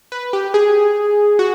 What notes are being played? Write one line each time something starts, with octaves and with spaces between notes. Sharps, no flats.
B4
G4
G#4
F#4